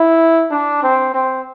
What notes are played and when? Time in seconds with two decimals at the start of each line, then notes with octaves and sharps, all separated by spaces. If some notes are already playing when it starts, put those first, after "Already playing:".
Already playing: E4
0.51 D4
0.83 C4
1.14 C4